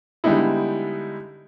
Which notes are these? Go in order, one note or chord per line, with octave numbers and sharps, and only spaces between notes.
D3 G3 G#3 B3 D#4 E4